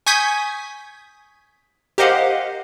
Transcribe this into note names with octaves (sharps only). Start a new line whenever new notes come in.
G#5 C#6 D#6 G6 G#6 B6
G4 A#4 C5 D#5 F5 F#5